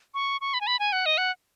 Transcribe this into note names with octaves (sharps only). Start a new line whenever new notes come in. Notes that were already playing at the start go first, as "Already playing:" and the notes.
C#6
C#6
B5
G#5
B5
G#5
F#5
D#5
F#5